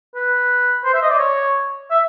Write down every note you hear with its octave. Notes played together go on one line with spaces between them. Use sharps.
B4
C5
E5
D#5
D5
C#5
E5